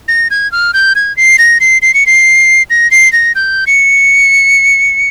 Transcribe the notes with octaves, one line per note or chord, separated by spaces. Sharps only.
A#6
G#6
F6
G6
G#6
C7
A#6
C7
C7
C#7
C7
A#6
C7
A#6
G6
C#7